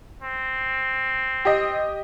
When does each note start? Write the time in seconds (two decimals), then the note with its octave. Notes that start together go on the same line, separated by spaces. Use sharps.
0.22 C4
1.45 G4 D#5